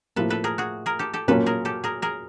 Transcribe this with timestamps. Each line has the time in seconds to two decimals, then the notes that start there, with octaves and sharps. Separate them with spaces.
0.16 A2 F3 A#3 A4 B4
0.30 A4 B4
0.44 G#4 A#4
0.58 F#4 G#4
0.86 G#4 A#4
0.99 G4 A4
1.14 G4 A4
1.28 A#2 F#3 A#3 C#4 F4 A4 B4
1.46 G#4 A#4
1.65 G4 A4
1.84 G#4 A#4
2.02 G#4 A#4